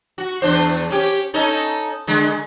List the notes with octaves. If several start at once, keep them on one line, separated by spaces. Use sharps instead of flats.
F#4
E2 D4 C5
C#4 G4
C#4 D#4 A4
D3 G#3